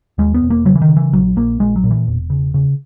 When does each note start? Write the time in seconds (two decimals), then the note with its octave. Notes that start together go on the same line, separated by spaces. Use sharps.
0.18 D#2 G#3
0.34 B3
0.42 E1
0.50 A#3
0.65 C#3 F#3
0.75 E3
0.82 D#3
0.89 C#3
0.97 E3
1.12 A#1 F#3
1.36 A#1 A#3
1.60 A#1 G#3
1.76 F#3
1.84 A#2
1.91 E3
2.08 E1
2.30 C#3
2.54 C#3